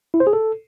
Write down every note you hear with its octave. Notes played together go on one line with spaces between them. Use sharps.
E4
C5
G#4
A4